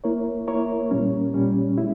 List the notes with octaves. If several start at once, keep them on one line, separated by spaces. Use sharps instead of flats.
A#3 E4 A#4 C#5
A#3 E4 A#4 C#5
A#2 G3 C#4
A#2 G3 C#4
G#3 E4